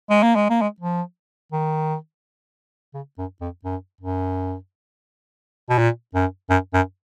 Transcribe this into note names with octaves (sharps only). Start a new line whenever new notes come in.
G#3
A#3
G#3
A#3
G#3
F3
D#3
C#3
F#2
F2
F#2
F#2
B2
A#2
F#2
F#2
F#2